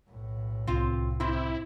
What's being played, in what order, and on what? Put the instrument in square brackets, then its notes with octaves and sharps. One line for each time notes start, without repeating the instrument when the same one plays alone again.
[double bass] B1 A2
[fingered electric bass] C2 [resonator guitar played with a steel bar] C4 F4 F5
[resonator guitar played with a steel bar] C3 C4 [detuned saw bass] E4